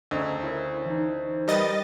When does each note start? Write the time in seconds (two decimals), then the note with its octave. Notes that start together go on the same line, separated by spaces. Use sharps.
0.11 D2 C#3 C5 D#5 A#5 E6
0.43 E4 A#4 C#5
0.86 E3 D#4
1.48 G3 A#4 B4 D#5 A6